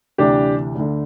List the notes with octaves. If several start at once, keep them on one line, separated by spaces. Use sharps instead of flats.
D2 C3 E3 D4 G4
D2 D3